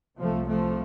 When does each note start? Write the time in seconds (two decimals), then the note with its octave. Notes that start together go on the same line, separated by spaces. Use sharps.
0.19 C2 C3 F3 A3
0.48 F3 A3